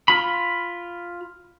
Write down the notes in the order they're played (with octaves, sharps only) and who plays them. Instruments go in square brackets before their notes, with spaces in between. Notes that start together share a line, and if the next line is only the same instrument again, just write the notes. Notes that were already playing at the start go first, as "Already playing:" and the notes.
[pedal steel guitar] F4 B5